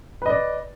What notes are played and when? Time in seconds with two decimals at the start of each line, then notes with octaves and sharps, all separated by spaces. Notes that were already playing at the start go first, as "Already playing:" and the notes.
0.22 B4
0.26 D#5
0.30 D5